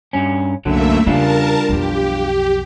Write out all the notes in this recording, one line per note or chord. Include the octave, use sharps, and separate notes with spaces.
G2 C#4
C2 F#2 D3 F#3 A3 A#3 E5
E2 C#3 G3 D4 F4 A#4 A5
B1 F2 G4